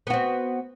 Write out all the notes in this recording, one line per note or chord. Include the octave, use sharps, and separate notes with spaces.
B3 C4 F#4